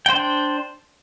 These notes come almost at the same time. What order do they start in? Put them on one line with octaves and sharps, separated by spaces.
G5 C5 D4